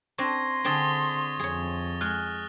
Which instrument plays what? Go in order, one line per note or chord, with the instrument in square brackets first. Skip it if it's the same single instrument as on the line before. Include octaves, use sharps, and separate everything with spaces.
[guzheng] C4 D4 [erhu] C6 [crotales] C#6 G#6 A#6
[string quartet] D3 [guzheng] C4 D4 G#4 [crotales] D#6 A6 G7
[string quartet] F2 [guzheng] G#4 C#5
[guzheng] G#3 [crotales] F6 F#6